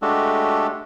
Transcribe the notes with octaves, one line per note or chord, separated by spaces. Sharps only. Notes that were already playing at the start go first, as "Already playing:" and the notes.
G#3 A3 D4 F#4 G4 A4